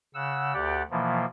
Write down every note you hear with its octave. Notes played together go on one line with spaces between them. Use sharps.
C#3 F#5 E6
D2 G4 D5 F#5
B2 E3 F3 A#3